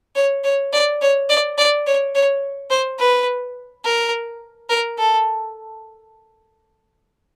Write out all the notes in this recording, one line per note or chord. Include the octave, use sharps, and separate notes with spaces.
C#5
C#5
D5
C#5
D5
D5
C#5
C#5
C5
B4
A#4
A#4
A4